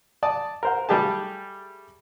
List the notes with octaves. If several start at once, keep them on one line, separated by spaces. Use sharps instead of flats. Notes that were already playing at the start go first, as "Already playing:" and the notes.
D5 A5 D#6
A#4 C5 F#5
G3 A3 G4 G#4 A5